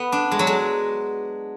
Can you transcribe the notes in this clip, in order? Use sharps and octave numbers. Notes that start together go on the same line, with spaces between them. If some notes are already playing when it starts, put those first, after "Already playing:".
Already playing: B3
D4
G#3
F#3
G#3